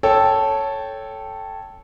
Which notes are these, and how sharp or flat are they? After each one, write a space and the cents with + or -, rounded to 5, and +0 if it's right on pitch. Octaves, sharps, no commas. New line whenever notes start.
A4 -5 C#5 +0 G5 +0